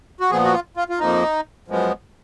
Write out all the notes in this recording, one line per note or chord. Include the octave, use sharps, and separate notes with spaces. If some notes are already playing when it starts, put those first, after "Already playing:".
F#4
A#2 F3 B3 G#4
F#4
F4
F4
F4
F2 F3 A#3 D#4
F#2 F3 G#3 B3